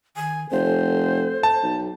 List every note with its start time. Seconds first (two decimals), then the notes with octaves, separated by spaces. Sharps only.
0.16 D#3 G#5
0.51 F1 A4 C5
1.43 A5
1.63 B1